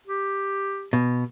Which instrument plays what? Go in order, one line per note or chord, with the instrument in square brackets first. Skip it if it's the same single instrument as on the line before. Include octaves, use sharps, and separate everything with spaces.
[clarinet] G4
[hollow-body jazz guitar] B2